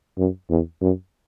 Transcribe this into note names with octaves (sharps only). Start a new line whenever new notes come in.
F#2
E2
F#2